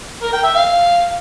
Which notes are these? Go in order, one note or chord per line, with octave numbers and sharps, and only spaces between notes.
A#4
G5
E5
F5